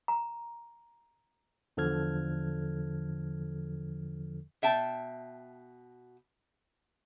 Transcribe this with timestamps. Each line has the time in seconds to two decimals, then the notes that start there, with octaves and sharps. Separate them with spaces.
0.08 A#5
1.77 E2 D3 F3 A4 F6 G#6
4.62 B2 E5 G5 A5